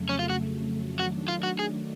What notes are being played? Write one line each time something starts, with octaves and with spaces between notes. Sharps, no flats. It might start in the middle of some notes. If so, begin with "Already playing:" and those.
Already playing: F2 C#3 F#3 A3
C#4
F4
F#4
D#3 F#3 A3 D4 F#4
F4
F#4
G#4